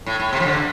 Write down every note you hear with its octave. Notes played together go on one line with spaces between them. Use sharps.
A2
A2
C3
F3
D3